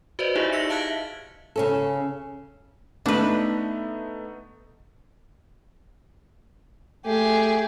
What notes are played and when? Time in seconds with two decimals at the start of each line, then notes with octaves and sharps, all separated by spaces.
0.19 F#4 B4 C5 D5 D#5
0.36 D#4 E4 G4 G#4 D#5 E5
0.52 D#5 E6 A#6 B6 C#7
0.69 E5 F5 A5 F6 F#6 G#6
1.56 C#3 C#4 A4
3.06 A3 B3 D4 D#4 B4
7.06 A3 G4 G#4